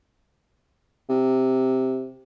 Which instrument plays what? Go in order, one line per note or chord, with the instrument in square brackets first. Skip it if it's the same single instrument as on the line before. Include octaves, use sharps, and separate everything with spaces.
[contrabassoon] C3